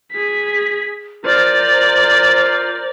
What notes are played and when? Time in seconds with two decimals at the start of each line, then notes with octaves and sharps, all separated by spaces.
0.12 G#4 B6
1.25 F4 A#4 C5 D5